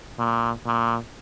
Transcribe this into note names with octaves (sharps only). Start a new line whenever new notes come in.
A#2
A#2